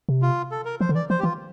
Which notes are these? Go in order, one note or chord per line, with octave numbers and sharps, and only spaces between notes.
C3
F4
A4
A#4
F3 C5
D3
E3 D5
F3 C5
G4
E3 F4